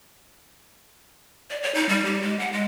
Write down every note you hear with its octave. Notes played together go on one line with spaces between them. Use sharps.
D5
C#5
D#4
G3
G4
G#3
F#5
G#3